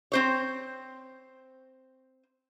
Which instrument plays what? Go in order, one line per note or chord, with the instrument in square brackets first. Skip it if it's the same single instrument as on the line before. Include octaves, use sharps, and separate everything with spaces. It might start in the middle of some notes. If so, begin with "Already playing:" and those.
[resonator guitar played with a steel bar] C4 C5 C#5